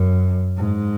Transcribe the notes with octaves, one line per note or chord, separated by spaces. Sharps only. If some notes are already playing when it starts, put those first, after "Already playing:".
Already playing: F#2
G#2